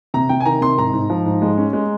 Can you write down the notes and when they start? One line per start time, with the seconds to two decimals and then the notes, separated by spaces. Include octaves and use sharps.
0.14 C3 A#5
0.29 C3 G5
0.41 G#5
0.45 D#3 A#5
0.61 C3 C6
0.78 G#2 A#5
0.93 G#2
1.10 F3
1.26 G#2
1.42 G#3
1.58 C#4
1.73 G#3